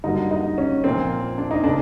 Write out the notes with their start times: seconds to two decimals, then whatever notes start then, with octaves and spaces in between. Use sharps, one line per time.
0.04 G2 D3 F#3 A#3 D#4
0.31 D#4
0.58 C#4
0.84 A#2 F3 A#3 C4
1.38 D4
1.51 D#4
1.64 C#3 D4